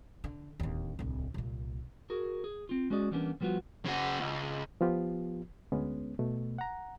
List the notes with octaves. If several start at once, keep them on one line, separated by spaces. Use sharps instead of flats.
D3
D1 D#2
D1 C2
C2 A#2
F#4 G#4 A#4
G#4
C4 F4
G#3 C#4 F#4 G#4 D5 D#5
E3 G3 A#3 B3 C#4 D4
F3 G3 B3 F4 F#4
C#3 F#4
C#2
F3 B3 F4 G4
D2 G#3 B3 C#4
B2 A3
F#5 A#5